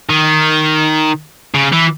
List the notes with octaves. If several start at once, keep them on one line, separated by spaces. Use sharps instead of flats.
D#3
C#3
E3